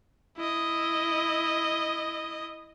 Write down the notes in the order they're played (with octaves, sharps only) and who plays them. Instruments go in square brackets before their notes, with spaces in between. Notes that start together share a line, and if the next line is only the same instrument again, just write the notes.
[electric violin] E4 D#5